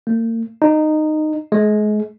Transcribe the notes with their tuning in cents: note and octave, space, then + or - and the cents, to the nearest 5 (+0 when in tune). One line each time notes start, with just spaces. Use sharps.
A#3 -40
D#4 -15
G#3 +30